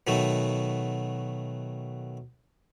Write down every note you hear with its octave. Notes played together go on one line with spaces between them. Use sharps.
B2 D#3 F#3 A3